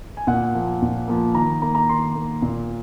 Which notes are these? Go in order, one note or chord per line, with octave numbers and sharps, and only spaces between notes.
G#5
A#2 F#5
F3 A#3
A#2
F3 A#3
D#3 A#5
A#3 A#5
A#5
D#3 C6
A#3
A#2